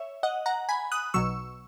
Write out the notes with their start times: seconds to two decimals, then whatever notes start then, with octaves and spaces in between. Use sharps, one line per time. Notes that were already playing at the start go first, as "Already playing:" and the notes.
Already playing: C#5 E5
0.23 D#5 F#5
0.46 F#5 A#5
0.69 G#5 B5
0.92 D#6 F#6
1.14 B1 B2 F#3 C#6 E6